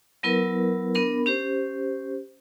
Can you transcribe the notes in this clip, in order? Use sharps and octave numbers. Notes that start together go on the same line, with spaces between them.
F#3 B3 E4 A#4 B4
B3 D4 A#4 B5
C#4 G4 C5